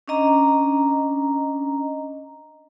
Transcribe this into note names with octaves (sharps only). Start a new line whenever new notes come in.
C#4 D4 D#5 A#5